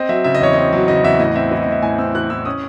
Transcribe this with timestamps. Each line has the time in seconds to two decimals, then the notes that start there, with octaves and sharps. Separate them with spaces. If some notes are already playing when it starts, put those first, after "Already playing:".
Already playing: C4 D#5
0.09 F#3 E5
0.24 C#3 E5
0.34 D#5
0.41 E2 C#5
0.53 C4 D#5
0.73 F#3
0.88 C#3 D#5
1.04 E2 E5
1.20 A2 D#5
1.36 C4 E5
1.51 E3 D#5
1.62 A2 D#5
1.72 E5
1.82 A2 G#5
1.98 C4 E6
2.14 E3 F#6
2.30 A2 E6
2.45 C#4 D#6